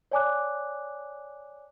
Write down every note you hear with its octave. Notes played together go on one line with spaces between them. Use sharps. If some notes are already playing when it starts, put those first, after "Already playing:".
C#5 D5 G#5 A5 D6 F#6